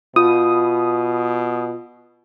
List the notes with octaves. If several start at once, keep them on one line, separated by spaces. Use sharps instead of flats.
B2 F4 D#6